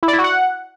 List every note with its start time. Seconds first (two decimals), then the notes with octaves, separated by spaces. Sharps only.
0.03 E4
0.08 D5
0.13 E4
0.19 F#4
0.24 F#5